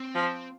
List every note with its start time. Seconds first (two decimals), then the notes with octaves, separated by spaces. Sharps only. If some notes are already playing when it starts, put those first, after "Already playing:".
Already playing: C4
0.15 F3